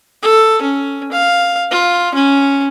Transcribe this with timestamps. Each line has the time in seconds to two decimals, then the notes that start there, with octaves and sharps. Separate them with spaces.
0.22 A4
0.62 C#4
1.12 F5
1.71 F4
2.14 C#4